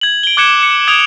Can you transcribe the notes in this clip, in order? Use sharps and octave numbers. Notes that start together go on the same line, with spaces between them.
G#6 F#7
D7 G7
D6 F#6 G#6 C#7 E7
C#7
D#6 G#6 D7 F7